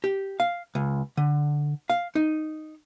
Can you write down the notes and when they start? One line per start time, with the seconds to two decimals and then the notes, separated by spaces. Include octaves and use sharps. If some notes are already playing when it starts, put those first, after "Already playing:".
0.04 G4
0.40 F5
0.75 C#2
1.17 D3
1.90 F5
2.15 D#4